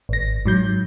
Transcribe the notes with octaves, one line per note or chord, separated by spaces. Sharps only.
G#1 A#6
G#2 F#3 G6